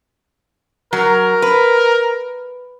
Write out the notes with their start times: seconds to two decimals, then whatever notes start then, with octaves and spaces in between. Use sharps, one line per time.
0.93 F#3 A#4
1.42 B4